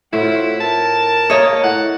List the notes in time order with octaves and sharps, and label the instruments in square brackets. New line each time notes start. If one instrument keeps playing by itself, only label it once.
[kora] A2 C4 [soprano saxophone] E4 [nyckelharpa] F4 F#5
[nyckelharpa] A#4 [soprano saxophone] A5
[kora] A#3 E5 [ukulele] C#5 D#5
[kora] A2 [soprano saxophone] F#5